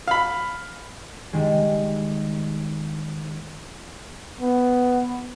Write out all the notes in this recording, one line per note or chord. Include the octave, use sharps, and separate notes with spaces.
F5 B5
D#3 G3 G#3
B3